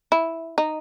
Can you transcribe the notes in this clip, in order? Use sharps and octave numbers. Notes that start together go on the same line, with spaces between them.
E4
D#4